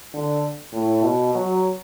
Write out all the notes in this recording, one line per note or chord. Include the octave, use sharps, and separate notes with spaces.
D3
A2
B2
F#3